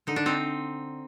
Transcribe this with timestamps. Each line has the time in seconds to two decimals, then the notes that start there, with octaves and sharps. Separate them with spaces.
0.07 D3 D#4
0.16 D4
0.26 C4 D#4